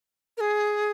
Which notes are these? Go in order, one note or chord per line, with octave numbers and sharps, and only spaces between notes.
A#4
G#4